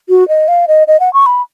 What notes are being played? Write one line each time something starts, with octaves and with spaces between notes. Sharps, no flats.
F#4
D#5
F5
D#5
D#5
F#5
C#6
B5